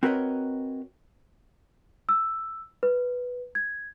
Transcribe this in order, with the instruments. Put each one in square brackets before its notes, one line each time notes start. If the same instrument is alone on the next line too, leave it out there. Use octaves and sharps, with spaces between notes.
[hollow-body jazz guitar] C4 F#4 A#4 B4 C#5 D#5
[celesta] E6
B4
G#6